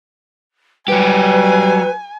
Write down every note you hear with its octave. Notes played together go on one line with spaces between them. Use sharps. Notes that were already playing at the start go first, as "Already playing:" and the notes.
F#3 G3 G4 B4 G#5